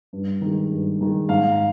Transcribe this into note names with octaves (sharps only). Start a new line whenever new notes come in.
G2
D#3 G#3
G2
D#3 G#3
G#2 F5